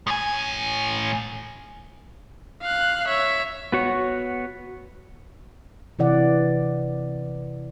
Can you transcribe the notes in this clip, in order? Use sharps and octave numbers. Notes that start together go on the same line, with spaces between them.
A2 G#5
F5 F#6
C#5 E5
B3 F#4 C#5
C3 E3 D5 F#5